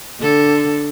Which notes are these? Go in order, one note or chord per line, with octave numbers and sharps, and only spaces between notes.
D3 A4